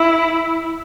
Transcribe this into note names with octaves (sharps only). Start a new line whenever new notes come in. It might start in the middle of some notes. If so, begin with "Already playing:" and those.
Already playing: E4